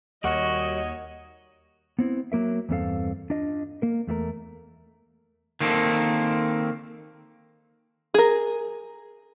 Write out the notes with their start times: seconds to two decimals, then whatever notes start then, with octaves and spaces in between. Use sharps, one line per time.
0.24 D#2 G3 F#4 A#4 C#5 D#5 F#5 C#6
1.99 B3 C4 E4
2.32 F#3 A#3 A#4 E5
2.69 E2 G2 C4 D#4 A4 F5
3.30 D4 F4 D#5
3.82 A#3 A#4
4.07 E2 A3 F4 A#4
5.60 D#3 A#3 C4 A4
8.14 G#4 A#4